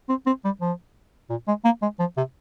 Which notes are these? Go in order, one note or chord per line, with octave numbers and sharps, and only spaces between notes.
C4
C4
G3
F3
A#2
G#3
A#3
G#3
F3
C3